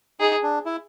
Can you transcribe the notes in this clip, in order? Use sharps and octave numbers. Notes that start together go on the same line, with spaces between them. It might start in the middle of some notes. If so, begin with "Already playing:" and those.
D#4 G#4
D4
E4